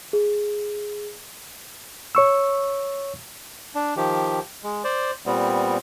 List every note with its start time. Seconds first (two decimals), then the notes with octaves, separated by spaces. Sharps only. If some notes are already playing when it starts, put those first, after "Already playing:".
0.13 G#4
2.15 C#5 C#6 E6
3.75 D4
3.97 D#3 F3 G4
4.63 G#3
4.84 C5 D5
5.26 A#2 G3 B3 C4